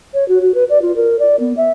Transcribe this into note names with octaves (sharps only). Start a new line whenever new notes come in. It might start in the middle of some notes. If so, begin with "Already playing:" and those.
C#5
F#4
F#4
B4
D5
F4
A#4
D5
B3
E5